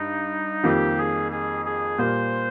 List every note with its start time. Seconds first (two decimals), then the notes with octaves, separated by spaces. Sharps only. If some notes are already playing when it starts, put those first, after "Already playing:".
Already playing: G2 D#4
0.64 F2 D#3 G3 A#3 G4
0.98 G#4
1.32 G#4
1.66 G#4
1.98 A#2 G3 A#3 C5